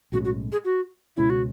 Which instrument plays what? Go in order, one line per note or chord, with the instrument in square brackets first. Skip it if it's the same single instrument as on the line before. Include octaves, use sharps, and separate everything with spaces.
[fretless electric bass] B1 A2 G#3 C#4 [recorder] F#4
[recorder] F#4
G#4
F#4
[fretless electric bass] C#2 B2 G#3 C#4 [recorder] E4
[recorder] F#4